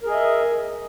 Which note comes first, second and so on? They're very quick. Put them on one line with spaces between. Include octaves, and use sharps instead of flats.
A#4 G#4 D#5 E5